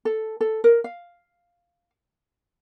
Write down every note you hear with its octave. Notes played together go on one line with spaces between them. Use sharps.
A4
A4
A#4
F5